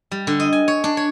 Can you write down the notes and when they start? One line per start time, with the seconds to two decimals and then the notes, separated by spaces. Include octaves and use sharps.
0.11 G3
0.27 D3
0.40 D#5
0.53 G#5
0.68 C#5
0.84 D4
0.97 C#5